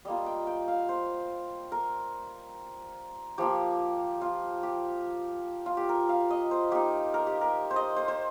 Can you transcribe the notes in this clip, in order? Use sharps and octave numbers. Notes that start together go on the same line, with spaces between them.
G3 A#3 F4 D#5
G5
G5
F5
C5
A#4
F3 A#3 F4 G4
F4
G4
F4
G4
A#4
F5
D#5
C5
A#3 D#4 G4
A#4
G4
A#4
C5
D#5
C5
C5